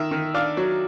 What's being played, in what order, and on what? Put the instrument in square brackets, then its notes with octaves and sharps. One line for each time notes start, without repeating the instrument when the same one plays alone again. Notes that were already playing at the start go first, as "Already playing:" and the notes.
Already playing: [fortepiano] D#3 E5
D#3
D4 F5
F#3